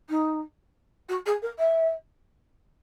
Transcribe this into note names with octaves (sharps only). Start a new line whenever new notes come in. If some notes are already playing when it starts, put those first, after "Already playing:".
D#4
F#4
G#4
A#4
E5